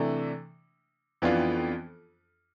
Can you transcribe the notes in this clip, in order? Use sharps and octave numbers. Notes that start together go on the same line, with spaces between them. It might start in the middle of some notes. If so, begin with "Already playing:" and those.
Already playing: C3 E3 A3 D4
F2 E3 B3 D4 F4